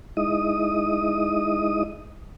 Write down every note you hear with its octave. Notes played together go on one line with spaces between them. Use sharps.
G#3 D#4 E4 D#5 D#6